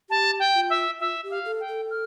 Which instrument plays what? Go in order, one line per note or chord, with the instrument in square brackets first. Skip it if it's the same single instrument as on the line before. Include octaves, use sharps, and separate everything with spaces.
[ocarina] G4 [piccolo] A5
[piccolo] G5
[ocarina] F4
[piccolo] E5
[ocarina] F4 [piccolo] E5
[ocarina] G4
[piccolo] F5
[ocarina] A4
[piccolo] G5
[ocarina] A4
[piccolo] F6